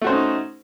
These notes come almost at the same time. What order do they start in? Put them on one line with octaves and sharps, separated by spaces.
A3 F#4 C5 C#4 D#4